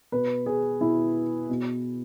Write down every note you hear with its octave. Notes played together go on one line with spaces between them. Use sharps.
B2 B4
G#4
B2 E4
B2